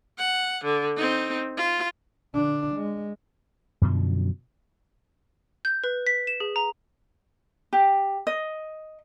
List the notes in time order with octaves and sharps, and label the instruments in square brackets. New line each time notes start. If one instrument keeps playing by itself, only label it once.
[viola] F#5
D3
C4 D#4
F4
[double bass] D3 D4
G#3
[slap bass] F#2 B2 D3 F3
[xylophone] G6
B4
B6
E7
G#4
A#5
[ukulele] G4
D#5